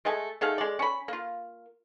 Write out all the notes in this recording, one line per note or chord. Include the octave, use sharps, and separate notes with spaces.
G#3 A3 D#5 G#5
D#3 A3 G#4 F5
G#3 D5
C#4 B5
A#3 F4